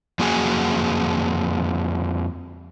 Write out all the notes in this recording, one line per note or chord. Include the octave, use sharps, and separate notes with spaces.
F2 A#3 F#4 G#4 F#5 G#5